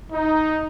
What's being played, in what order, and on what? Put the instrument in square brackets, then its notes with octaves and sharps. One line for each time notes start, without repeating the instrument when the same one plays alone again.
[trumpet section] D#4